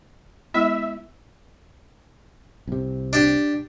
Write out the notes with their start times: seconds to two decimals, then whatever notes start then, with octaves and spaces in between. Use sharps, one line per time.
0.54 G#3 B3 E4 E5
2.67 C2 C3
3.13 D4 G4